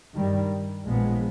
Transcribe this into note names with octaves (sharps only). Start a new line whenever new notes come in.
G2 D#3 G3
A#1 A#2 F3 G#3 B3